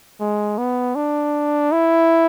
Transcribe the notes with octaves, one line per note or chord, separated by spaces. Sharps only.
G#3
B3
D4
E4